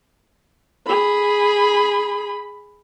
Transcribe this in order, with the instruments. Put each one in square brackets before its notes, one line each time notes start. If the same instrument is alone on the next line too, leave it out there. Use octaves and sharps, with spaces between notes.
[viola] G#4 B5